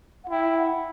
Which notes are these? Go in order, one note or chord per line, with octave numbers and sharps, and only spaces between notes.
F#5
E4 G5
F#5